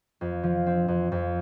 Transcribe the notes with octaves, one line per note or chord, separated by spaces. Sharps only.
F2
F3
C4
F2
F2